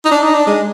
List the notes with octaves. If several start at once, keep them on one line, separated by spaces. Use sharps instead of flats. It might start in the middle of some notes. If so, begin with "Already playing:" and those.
D#4
D4
D#4
D4
G#3